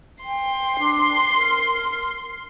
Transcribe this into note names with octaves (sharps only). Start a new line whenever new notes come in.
G5 C6
D4
A#4